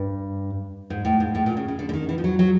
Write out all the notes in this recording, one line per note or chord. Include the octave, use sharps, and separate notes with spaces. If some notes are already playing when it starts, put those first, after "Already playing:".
Already playing: G2
G#2
A2
G#2
A2
A#2
C#3
C#3
D3
D3
D#3
E3
F3
F#3
F#3